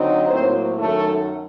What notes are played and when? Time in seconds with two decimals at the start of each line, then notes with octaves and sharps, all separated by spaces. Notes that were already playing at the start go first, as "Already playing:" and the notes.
Already playing: D3 F#3 C4 D#4
0.30 A2 F#3 A#3 C4 C5
0.78 F#2 D#3 F#3 A3 A4